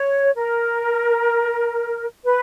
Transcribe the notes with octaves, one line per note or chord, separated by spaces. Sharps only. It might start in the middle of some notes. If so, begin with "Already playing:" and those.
Already playing: C#5
A#4
B4